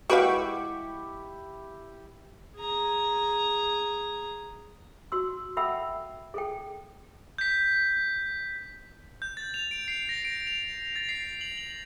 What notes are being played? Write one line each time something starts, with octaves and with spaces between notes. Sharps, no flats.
G#3 E4 F#4 G4 B4 F5 G5 C#6
G#4 A#5
F#4 C6 E6
A4 E5 F#5 G5 B5 E6
G#4 A4 G5
G6 B6
G6
A6
F7
D7
C7
A#6
D7
F7
A6
C7
F#7
F#7